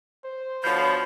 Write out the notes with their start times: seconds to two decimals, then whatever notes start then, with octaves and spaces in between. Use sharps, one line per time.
0.24 C5
0.64 B2 D3 F3 C#5 B5 G6